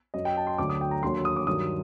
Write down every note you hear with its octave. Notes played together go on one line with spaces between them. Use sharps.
F#2 F#3 D#5
G5
A5
C6
D2 D3 F#3 D6
D#6
G5
A#5
D#2 D3 F#3 C6
D#6
D6
G2 D#3 F#3 D#6